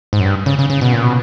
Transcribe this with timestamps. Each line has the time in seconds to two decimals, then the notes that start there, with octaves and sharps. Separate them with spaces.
0.13 G#2
0.20 F#2
0.25 G2
0.46 C#3
0.59 C#3
0.70 C#3
0.81 B2
0.93 A#2
1.03 B2